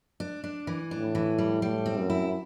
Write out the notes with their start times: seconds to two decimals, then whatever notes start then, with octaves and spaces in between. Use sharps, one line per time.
0.20 D4
0.44 D4
0.67 E3
0.91 A2 D4
1.15 E3
1.38 G3
1.62 A2 G3
1.86 C4
1.98 F#2
2.10 E4